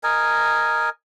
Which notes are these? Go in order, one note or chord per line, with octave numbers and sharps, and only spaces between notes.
A#4 D#5 G#5